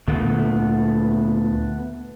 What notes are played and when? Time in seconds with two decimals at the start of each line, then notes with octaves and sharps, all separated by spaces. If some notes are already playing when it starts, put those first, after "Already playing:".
0.08 D2 A#2 D3 A3 B3